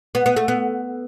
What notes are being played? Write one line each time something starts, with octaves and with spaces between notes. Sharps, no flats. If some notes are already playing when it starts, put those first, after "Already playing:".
B3
B3
A3
B3